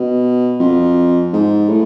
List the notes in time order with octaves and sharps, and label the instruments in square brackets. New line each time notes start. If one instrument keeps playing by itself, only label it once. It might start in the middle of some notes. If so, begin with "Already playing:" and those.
Already playing: [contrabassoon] B2
F2
G#2
A2